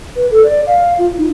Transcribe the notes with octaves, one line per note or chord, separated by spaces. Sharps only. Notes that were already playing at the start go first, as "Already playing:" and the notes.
B4
A4
D5
F5
F4
D#4